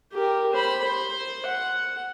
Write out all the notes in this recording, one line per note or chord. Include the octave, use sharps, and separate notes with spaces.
G4 A#4
C5 B5
C5
F#5